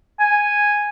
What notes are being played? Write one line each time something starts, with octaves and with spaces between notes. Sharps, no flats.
G#5